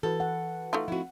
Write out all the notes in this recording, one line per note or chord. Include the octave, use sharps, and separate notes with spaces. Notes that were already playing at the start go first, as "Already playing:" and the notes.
E3 F#4 A4 B4
F#5
A3 D#4 F4
F3 C4 E4 F#4